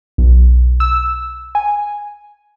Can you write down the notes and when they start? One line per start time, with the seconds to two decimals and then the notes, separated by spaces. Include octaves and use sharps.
0.18 B1
0.80 E6
1.55 G#5